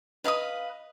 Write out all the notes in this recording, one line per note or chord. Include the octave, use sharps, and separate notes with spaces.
B4 D#5 F5 B5 D#6